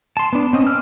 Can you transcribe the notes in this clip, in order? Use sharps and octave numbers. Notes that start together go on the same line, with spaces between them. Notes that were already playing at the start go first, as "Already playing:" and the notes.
A5 C6
B3 D4
C4 C#4 D#5
D6 E6 F6